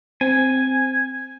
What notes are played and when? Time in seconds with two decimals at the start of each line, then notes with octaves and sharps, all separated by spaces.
0.21 C4 G#5